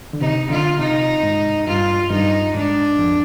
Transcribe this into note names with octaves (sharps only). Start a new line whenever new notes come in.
D3
C3 D#4
D3 F4
C3 D#4
G#2
G2 F4
G2 D#4
G#2 D4
F2